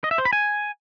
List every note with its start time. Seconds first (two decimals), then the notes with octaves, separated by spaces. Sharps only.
0.04 D#5
0.11 E5
0.18 C5
0.25 B5
0.33 G#5